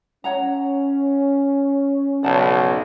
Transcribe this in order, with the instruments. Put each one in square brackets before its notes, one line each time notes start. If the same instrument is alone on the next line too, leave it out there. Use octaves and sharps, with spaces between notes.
[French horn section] C#4 [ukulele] C#5 F#5 A#5
[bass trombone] B1 [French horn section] F2 G#2 C#3 [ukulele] D5 F#5 A5